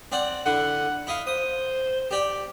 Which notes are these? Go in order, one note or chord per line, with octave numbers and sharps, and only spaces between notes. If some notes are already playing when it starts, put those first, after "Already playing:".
C4 D5 F#5
D3 E4 F#5
E4 D#5 F5
C5 D#6
G4 D5 G5